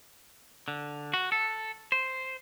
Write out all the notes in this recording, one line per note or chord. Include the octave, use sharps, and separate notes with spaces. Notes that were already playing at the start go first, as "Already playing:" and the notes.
D3
F#4
A4
C5